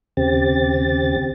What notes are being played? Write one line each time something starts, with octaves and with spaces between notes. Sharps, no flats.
D#2 C#3 C4 G4 A6